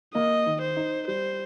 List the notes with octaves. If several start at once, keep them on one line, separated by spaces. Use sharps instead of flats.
A#3 D#5
D#3
C5
D#4
G3 C5